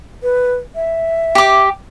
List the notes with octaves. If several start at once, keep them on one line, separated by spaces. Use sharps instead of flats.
B4
E5
G4 D6